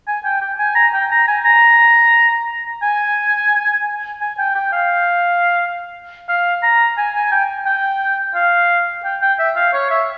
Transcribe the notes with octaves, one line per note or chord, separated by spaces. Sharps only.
G#5
G5
G5
G#5
A#5
G5
A#5
G#5
A#5
G#5
G#5
G5
G5
F5
F5
A#5
G#5
G#5
G5
G5
F5
G5
G5
E5
F5
C#5
E5